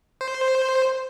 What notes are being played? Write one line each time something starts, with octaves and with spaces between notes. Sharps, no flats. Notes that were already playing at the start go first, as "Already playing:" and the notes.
C5